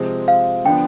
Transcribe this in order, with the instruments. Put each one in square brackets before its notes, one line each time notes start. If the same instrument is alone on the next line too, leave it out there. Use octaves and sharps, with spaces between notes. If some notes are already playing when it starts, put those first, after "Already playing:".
Already playing: [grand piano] C3 F3 G#3 C4
[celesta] F5
[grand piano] D3 F3 B3 D4 [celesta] G5